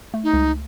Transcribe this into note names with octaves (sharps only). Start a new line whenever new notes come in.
A3
D#4
C#2